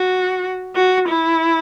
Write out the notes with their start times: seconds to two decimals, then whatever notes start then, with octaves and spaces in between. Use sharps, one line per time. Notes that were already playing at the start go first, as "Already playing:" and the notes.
Already playing: F#4
0.75 F#4
1.08 E4